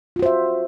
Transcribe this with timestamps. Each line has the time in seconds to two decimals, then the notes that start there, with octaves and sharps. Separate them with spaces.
0.16 F4
0.19 F#4
0.22 C5
0.26 E5